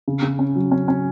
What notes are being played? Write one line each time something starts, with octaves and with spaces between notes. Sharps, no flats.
C#3
C#3
C#4
F#3
C#4
C#4